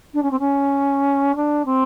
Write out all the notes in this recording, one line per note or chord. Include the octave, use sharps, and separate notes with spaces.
D4
C#4
C4
C#4
D4
C4